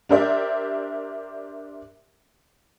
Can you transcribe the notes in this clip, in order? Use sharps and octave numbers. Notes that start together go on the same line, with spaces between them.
D4 G4 A#4 C5 D5 E5